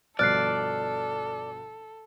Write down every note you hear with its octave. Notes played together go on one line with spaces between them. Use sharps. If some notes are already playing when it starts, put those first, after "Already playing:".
G1 B2 F3 A4 D5 F6 F#6 C7